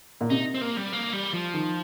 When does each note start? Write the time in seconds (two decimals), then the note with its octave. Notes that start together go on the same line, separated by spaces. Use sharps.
0.21 A#2
0.30 C3 D#4
0.55 C4
0.61 A#3
0.77 G3
0.93 A#3
1.13 G3
1.34 F3
1.54 D#3